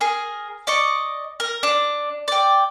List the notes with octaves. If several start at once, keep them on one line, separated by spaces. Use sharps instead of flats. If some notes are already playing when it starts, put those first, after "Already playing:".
G#4 A#4
D5 D#5 C#6
A#4
D4
D5 G5